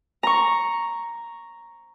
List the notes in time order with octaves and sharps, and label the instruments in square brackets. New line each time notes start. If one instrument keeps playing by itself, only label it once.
[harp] A#5 C#6